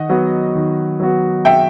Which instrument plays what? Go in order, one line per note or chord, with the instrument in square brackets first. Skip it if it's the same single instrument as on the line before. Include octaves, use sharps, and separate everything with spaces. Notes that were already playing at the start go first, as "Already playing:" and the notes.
Already playing: [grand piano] D#3 [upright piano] D#5 F#5
[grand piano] F#3 B3 F#4
D#3
F#3 B3 F#4
[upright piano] E5 G5